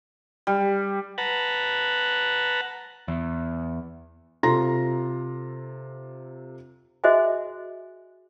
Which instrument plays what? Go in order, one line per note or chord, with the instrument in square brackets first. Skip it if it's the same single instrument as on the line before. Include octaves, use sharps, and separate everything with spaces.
[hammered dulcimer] G3
[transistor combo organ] B4 F#5 A5 A#5
[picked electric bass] E2
[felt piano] C3 F4 A4 A#5 C6 A#6
[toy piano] F#4 G#4 C5 D#5 E5 G#5